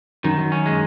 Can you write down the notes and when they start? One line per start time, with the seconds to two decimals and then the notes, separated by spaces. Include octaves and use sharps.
0.24 F#2 D#3
0.38 F#2
0.52 C#4
0.66 G#3